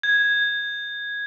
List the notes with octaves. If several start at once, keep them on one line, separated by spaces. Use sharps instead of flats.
G#6